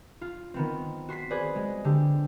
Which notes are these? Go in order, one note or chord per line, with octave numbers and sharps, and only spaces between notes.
F4
D#3 B3 C4
F#4 C6 B6 C7
G#4 B4 C5 D5
G#3
D3 G4